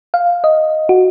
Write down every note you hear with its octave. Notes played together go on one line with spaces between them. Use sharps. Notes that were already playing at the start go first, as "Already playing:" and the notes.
F5
D#5
F#4